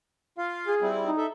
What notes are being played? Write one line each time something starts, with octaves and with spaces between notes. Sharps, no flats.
F4 F5
G#4
G3 C4 E4
D#4
A4 E5